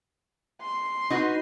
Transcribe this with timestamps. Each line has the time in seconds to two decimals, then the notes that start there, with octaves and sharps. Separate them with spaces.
0.62 C6
1.10 D#4 F#4 B4